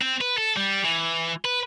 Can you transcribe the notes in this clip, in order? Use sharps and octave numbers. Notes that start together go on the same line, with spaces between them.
C4
B4
A4
G3
E3
B4